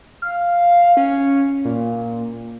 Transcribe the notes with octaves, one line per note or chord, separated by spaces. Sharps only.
F5
C#4
A#2